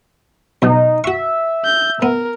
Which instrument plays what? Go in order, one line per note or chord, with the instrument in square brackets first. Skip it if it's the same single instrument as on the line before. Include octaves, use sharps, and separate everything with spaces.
[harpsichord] B1 B2 [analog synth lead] D#4
[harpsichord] F#4 C#6 [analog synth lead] E5
[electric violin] G6
[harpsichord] B3 [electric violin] A#4